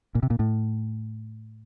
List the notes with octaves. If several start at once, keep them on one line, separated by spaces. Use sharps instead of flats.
A#2
C3
A#2
A2